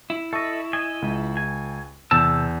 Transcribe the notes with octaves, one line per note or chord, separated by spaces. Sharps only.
E4
A4 D#5 E5 C#6
D#5 G#5
C#2
G#5
E2 C3 A5 E6 G6